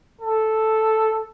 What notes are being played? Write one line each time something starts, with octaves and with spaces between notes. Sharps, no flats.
A4